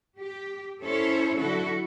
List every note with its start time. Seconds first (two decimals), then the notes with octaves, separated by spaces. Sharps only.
0.19 G4
0.83 C#4 E4 A4 C5 C#5
1.38 D3 F#3 E4 F#4 A4